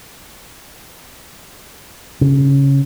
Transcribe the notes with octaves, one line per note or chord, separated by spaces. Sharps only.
C#3